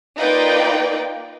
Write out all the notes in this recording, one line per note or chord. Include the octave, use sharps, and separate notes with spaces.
A#3 D#4 F4 B4 D5 G5